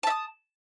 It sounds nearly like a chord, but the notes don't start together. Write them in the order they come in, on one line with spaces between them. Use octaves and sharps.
A5 E5 D#6